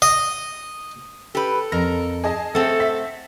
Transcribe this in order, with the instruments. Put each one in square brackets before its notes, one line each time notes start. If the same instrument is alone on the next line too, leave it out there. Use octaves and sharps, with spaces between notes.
[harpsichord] D#5
[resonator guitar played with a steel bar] G4 B4 [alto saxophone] A4
[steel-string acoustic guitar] F2 [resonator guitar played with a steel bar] A#4 [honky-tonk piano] A#6
[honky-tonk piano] G#4 D#5 A5
[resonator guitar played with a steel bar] A3 C4 [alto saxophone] A4 [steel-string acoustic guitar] F#5
[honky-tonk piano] E5 B6